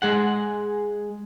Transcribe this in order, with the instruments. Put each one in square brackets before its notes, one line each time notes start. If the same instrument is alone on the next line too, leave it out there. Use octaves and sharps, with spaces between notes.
[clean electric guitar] G#3 G#4 F#5